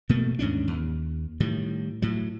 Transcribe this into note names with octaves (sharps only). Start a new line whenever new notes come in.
B2 A3 A#3
D#2 G#2 C#4 D4
D#2
A2 D#3 G3
A2 F#3